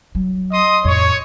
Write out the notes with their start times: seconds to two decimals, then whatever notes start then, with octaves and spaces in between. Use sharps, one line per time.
0.15 F#3
0.52 D#5 C6 D#6
0.85 F2 A2 C#5